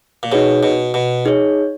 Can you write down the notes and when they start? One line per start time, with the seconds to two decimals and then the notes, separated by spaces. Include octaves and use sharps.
0.23 A#2
0.32 B2 D#4 G#4 C#5
0.63 B2
0.94 B2
1.25 D#4 G#4 C#5